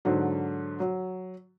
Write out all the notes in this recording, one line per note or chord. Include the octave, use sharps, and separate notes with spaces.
G#2 D3 F#3
F#3